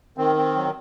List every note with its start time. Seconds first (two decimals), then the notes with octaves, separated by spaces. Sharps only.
0.18 D#3 C4
0.36 C4
0.56 F#3